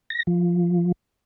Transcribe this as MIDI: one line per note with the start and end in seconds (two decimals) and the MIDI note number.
0.10 0.23 94
0.27 0.92 53